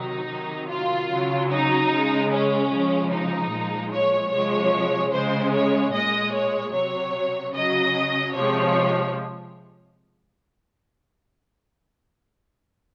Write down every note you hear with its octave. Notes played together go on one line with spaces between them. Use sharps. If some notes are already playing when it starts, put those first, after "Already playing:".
Already playing: C3 D#3 F#3 D#4
C3 D#3 F#3
F4
C#3 F#3
D#4
C#3 G#3
C#4
C#3 F3 G#3
D#4
A#2 F3 G#3
C#5
C3 F3 G#3 C#5
C#3 G#3 C5
C#5
A#2 G#3 D#5
C#5
C3 F#3 C#5
C#3 F#3 D#5
C3 F3 G#3 C#5